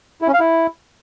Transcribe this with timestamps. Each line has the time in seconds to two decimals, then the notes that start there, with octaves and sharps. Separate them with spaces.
0.22 E4
0.28 C#4
0.34 F5
0.40 E4